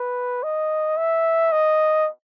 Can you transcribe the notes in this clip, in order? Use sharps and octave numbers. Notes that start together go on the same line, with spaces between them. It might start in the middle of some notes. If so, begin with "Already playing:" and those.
Already playing: B4
D#5
E5
D#5